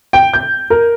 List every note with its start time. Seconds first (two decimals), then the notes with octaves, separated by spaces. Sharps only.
0.13 G5
0.34 G6
0.70 A#4